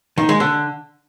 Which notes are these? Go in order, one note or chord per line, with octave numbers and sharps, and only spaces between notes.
D#3
G#3
D3